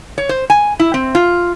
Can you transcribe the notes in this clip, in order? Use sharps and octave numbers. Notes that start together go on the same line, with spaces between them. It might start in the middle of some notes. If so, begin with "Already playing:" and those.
C#5
C5
G#5
E4
C4
F4